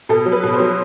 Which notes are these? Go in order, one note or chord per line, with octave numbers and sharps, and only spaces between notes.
B2 A4
F#3
B4
B2
C5
F#3